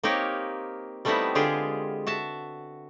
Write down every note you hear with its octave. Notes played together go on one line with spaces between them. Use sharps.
A#3 C4 D#4 G4 A#4 C#5
G3 A3 B3 C4 D#4 E4
D3 G#3 F4 G4 G#4
F#4 E5 A5